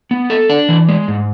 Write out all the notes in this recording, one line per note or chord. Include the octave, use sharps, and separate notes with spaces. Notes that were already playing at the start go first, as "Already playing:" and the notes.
B3
A4
D4
E3
G#3
G#2